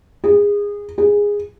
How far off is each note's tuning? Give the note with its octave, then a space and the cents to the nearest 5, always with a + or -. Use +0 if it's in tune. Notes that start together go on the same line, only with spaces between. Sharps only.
G#4 -25
G#4 -15